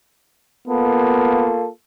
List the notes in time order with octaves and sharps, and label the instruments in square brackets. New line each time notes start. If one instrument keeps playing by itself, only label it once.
[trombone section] A#3 F4 A4 [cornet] B3